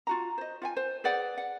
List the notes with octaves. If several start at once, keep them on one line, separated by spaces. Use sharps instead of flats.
F4 F#4 A#5
C5 D#5
F4 F#5 G#5
C5
G#4 B4 D5 F#5
F#5